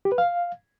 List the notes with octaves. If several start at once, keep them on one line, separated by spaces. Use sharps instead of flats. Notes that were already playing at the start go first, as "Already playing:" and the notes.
G4
B4
F5